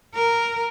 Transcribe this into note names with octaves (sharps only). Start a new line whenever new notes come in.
A#4